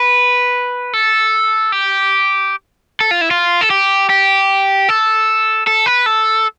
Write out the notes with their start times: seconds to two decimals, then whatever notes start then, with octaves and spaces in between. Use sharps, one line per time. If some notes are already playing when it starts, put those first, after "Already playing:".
Already playing: B4
0.93 A4
1.72 G4
3.00 A4
3.11 F4
3.21 E4
3.31 F4
3.61 A4
3.70 G4
4.10 G4
4.89 A4
5.67 A4
5.86 B4
6.06 A4